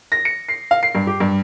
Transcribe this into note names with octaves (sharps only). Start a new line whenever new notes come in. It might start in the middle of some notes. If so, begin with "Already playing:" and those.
A#6
C#7
C7
F5
C7
G2
G4
G2